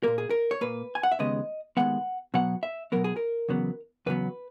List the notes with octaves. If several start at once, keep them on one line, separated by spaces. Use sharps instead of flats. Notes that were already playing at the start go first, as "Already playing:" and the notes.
A#2 A#3 A#4
G#4
A#4
C#5
A#2 A#3 B4
G#5
F#5
E5
D#2 C#3 G#3 B3 D#5
D#2 C#3 G#3 B3 F#5
B2 F#3 B3 F#5
E5
B2 F#3 B3 A#4
G#4
A#4
E2 C#3 F#3 B3
E2 C#3 F#3 B3 B4